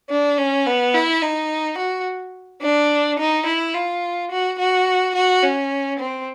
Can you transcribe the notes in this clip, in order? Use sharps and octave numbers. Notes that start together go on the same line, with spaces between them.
D4
C#4
B3
E4
D#4
F#4
D4
D#4
E4
F4
F#4
F#4
F#4
C#4
C4